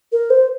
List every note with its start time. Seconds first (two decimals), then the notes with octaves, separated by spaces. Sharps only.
0.12 A#4
0.30 C5